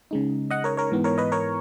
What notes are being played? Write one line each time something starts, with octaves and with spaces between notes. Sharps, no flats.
C#3 G#3 D#4
D#5 F#5
A#4 C#5
A#4 C#5
G#2 E3 B3
A#4 C#5
B4 D#5
A#4 C#5